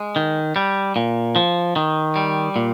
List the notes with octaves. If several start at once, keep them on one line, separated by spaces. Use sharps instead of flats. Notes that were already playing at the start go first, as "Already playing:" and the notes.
Already playing: G#3
D#3
G3
A#2
F3
D#3
G3
A#2